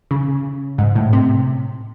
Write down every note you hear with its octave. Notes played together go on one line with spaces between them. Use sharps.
C#3
G#2
A2
C3